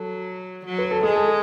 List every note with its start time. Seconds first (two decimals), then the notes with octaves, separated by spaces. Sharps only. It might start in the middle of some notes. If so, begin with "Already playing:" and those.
Already playing: F#3 A4
0.65 F#3
0.78 B4
0.91 A4
1.03 G#3 G#4
1.15 A4
1.28 G#4